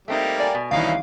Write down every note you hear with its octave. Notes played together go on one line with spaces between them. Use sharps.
G3 A3 A#3 C4 D#4 G4
D5 G#5
B2
C2 D#3 E3 C#4 D#4 E4 F5